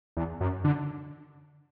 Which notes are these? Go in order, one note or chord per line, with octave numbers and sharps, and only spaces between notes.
E2
F#2
D3